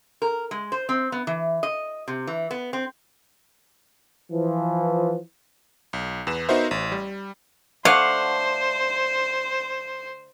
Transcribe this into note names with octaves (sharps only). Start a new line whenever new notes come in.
A#4
G#3
C5
C4
B3
E3
D#5
C3
E3
B3
C4
E3 F3
B1
E2 B4 E7
B3 D#4 F#4 A#4 C5 E5
A1
G3
D3 A3 C5 F5 F#5